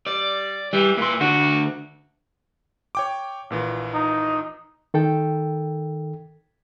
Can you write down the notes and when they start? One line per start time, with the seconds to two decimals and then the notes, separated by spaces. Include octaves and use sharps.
0.06 G3 D5
0.73 E3 G3
0.98 A#2 E3 C6
1.21 D2 D4 F#4
2.95 C#5 G5 D6
3.50 A#1 A#2 E3
3.94 D#4
4.94 D#3 A4 G5